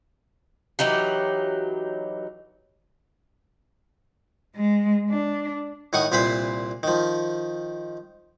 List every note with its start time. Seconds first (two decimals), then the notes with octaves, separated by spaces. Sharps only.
0.79 E3 F#3 D#4 G4
4.56 G#3
5.10 D4
5.93 A2 D#3 F#5 C#6 D#6
6.12 C2 A#2 B4 C5 B5 C6
6.83 D#3 F3